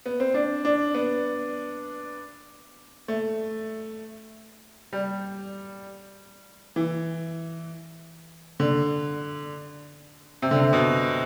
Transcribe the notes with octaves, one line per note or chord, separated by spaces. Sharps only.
B3
C4
D4
D4
B3
A3
G3
E3
D3
C3
D3
C3
B2